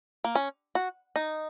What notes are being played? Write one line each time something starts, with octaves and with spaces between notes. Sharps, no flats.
A#3
C#4
F#4
D#4